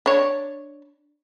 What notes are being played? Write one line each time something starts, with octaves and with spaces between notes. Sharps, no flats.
D4 C#5